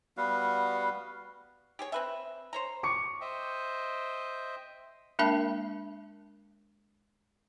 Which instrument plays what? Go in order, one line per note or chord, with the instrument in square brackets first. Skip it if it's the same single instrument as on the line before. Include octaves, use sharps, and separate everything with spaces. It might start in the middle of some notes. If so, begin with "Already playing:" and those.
[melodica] G3 B3 F#4 F5
[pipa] G4 G#4 C#5
C4 B4 E5
C5 C#5 A#5
[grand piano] C#6 D6 C#7
[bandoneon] C5 D#5 E5 G5
[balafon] G#3 A#3 D4 A#4 E5 A5